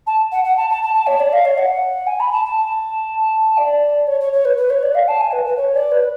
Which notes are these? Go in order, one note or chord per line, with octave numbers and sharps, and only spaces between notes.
A5
F#5
F#5
A5
A5
A5
A5
C#5
D5
F5
C#5
F#5
G#5
B5
A5
A5
D5
C#5
C#5
C#5
B4
B4
C#5
D5
F5
A5
G#5
B4
B4
C#5
D5
B4